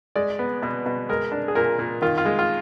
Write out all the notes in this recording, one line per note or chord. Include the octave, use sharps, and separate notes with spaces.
G#3 D5
B3
B2
B2
G#3 A#4
D4
G#4
A#2 A#4
A#2
D#3 F4
F4
G#3
F4